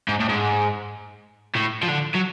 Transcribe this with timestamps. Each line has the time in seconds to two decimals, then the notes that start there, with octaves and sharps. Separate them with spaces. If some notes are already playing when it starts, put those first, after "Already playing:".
0.08 G#2
0.20 A2
0.29 G#2
1.56 A2
1.83 F3
1.88 D3
2.15 F#3